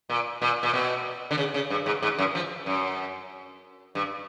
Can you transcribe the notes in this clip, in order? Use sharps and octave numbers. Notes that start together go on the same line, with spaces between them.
A#2
A#2
A#2
B2
D3
C#3
C#3
G2
G#2
G#2
F#2
F3
F#2
G2